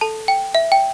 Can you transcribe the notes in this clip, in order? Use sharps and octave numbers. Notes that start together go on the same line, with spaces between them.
A4 A5
G5
E5
G5